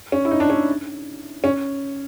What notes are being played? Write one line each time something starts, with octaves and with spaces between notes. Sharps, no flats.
C#4
E4
D#4
D4
C#4
C#4